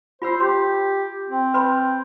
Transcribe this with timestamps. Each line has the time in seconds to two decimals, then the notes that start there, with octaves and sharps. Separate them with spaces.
0.22 F4 C5 B5 E6
0.40 G4 C6
1.30 C4
1.54 B4 B5 C6